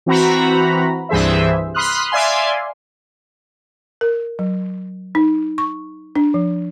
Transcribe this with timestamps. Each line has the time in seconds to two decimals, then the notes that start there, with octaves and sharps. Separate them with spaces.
0.06 E3 C4 F#4 A#5 B5
1.09 C2 G2 E3 G#4 C5 E5
1.74 B5 C6 D#6 F6 F#6
2.11 D5 E5 F5 G#5 C6
4.01 A#4
4.39 F#3
5.15 D#4
5.58 C#6
6.16 D4
6.34 F3